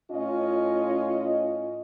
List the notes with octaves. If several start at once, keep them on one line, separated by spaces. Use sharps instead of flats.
A2 C#4 F4 D#5